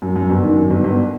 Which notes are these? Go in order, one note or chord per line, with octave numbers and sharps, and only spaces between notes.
F#2
F#2
G1
D#3
F#2
G1
G1